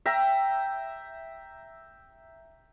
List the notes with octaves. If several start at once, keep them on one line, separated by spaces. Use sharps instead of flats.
E5 G5 A#5